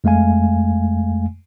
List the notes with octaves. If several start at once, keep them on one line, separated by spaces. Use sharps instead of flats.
F2 G#3 A3 F5 G#5